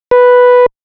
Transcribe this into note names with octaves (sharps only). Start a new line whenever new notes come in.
B4